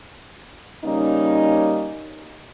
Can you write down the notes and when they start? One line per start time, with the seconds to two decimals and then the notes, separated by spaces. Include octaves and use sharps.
0.85 C#3 G3 A#3 C#4 D#4